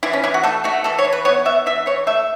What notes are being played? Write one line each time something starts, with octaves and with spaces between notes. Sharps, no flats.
E3 E4
C#4
E3 E4
F#4
A3 A4
A3 F#4
E3 A4
C#5
E3
B4
B3 C#5
B3 E5
E3 E5
E3 C#5
A3 E5